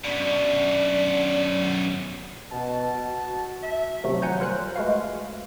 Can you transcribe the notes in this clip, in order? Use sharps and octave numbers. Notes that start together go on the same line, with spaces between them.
F#2 B2 D4
B2 A5
F#4
E5
C3 D#3 F3 F#3 A3
F3 F#3 F#5 G#5 A#5 G6
G3 F4 A#4 C5 F#6
G#3 A3 F#4 B4 F5